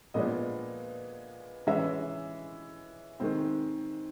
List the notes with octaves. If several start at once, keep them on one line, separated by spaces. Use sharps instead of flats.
A#2 F3 G#3 B3 D4 D#5
E3 G#3 C#4 E5
D#3 G#3 C4